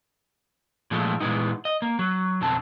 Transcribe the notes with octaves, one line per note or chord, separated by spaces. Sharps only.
A#2 F3 G#3 A3
A#2 E3 F3 G#3 B3 D#4
D#5
A#3
F#3
B1 F2 D3 C4 A5